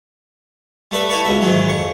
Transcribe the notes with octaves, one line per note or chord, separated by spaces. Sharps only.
G3 A3 B4 E5
D#4 E4 B4 A5 C#6
C#2 B2 E5
G#2 D#3 E3 F#3
F2 C#6